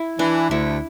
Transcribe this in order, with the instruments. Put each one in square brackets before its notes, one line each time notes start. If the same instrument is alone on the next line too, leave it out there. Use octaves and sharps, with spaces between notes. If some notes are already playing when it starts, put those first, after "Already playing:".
Already playing: [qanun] E4
[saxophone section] E3 [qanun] D4
[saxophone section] D2 [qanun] E4